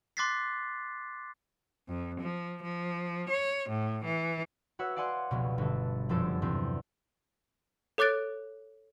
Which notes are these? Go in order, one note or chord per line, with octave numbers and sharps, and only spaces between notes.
C6 D6 F#6 A6 B6 C7
F2
F3
F3
C#5
A2
E3
F#4 B4 C#5 E5 F#5 E6
D5 F5 F#5 G#5 C6 F#6
F1 C#2 B2
G1 A4
F1 F#2 F3 A4 C5 D5
E2 G2 C3 C4
A4 C#5 D6 F#6 A6 D7